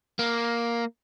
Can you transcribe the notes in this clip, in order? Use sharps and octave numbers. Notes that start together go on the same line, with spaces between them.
A#3